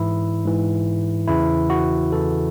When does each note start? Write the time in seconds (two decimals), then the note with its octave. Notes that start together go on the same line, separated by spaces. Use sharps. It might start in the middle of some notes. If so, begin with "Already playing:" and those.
Already playing: G#2 E3 E4
0.44 G#2 E3
1.28 E2 C#3 E3 E4
1.70 F#4
2.12 E2 C#3 E3 A4